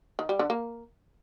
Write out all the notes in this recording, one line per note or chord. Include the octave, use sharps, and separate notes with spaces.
D#3
G3
D3
A#3